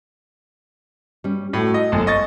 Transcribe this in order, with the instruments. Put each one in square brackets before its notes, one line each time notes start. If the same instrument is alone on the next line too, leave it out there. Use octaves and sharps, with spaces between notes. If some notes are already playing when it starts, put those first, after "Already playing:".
[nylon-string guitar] G3 C#4
[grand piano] A2 [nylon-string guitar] A3 F#4 D5
[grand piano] D#5
[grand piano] G1 F#2 [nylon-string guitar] G#3
[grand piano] D#5 C#6 A6